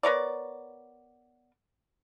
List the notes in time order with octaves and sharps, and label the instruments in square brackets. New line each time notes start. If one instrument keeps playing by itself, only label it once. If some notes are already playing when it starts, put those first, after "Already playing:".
[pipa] B3 A#4 C#5 D5